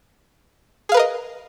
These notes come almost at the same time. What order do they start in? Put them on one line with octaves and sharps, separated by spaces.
G#4 F5 B4 A#4 D#5